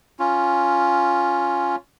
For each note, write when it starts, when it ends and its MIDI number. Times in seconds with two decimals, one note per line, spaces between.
0.20 1.76 61
0.20 1.76 65